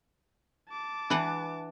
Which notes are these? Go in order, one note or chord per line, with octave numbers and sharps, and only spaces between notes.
A5 D6
E3 D4 B4 F#5